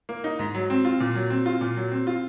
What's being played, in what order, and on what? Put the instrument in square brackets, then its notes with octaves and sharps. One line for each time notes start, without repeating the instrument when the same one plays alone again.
[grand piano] A#3
D#4
G#2
F#3
C4
F4
A#2
F#3
C4
F4
A#2
F#3
C4
F4